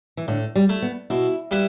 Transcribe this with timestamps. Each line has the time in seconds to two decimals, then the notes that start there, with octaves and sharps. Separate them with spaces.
0.17 E3
0.28 A2 D3
0.56 G3
0.69 A3 E4
0.82 B3
1.10 B2 E4
1.51 G3 E4 B4 E5